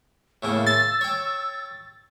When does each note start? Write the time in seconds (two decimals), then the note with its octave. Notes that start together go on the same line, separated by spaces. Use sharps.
0.43 A2 C#3 A#3 E6
0.67 C6 A6
1.01 C#5 G5